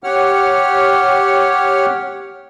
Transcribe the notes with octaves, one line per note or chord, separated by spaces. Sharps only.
G4 C#5 F#5 F6